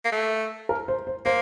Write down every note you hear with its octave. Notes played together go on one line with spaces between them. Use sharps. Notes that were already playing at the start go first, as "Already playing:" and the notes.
A#3
A3
A#4
C5
C5
A#3 C5